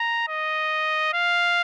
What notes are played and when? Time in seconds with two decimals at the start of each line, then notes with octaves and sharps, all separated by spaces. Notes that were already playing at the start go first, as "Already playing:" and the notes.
Already playing: A#5
0.28 D#5
1.14 F5